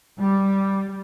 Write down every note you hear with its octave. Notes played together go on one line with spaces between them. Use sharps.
G3